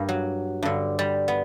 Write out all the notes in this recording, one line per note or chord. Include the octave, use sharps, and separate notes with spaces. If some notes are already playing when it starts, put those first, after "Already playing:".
Already playing: G2 A#3
F#3
G2 D3
G3
B3